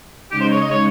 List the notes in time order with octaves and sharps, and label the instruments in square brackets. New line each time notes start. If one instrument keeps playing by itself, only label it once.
[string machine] C#3 G#3 D#4 [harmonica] G4
[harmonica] C5
C#5
D#5
C#5